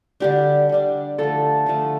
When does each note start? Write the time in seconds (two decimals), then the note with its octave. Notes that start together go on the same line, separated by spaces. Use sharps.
0.20 D3 G3 D4 G4
0.69 D3 G3 D4
1.18 D3 F3 A3 A4
1.66 D3 F3 A3